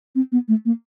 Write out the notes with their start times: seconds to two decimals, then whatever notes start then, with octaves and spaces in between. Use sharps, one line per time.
0.15 C4
0.32 B3
0.48 A3
0.65 A#3